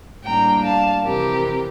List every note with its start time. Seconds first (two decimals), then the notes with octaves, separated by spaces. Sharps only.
0.24 A2 G3 A#3 D4 G5 A#5
0.64 F5 A5
1.04 F2 C3 E3 G4 A#4